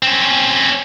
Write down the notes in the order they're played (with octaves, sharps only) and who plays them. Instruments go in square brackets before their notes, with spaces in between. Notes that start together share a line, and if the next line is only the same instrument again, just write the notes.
[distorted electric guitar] C4 C#4